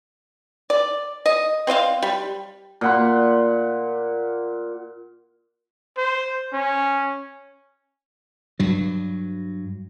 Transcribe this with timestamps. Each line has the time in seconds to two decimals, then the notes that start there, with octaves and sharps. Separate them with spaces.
0.70 D5
1.26 D#5
1.67 C4 C5 D#5 F5
2.02 G3
2.81 A#2 F#5 C6
5.97 C5
6.53 C#4
8.59 G2 F#3